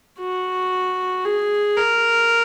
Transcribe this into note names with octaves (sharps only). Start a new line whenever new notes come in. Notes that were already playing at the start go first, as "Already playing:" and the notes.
F#4
G#4
A#4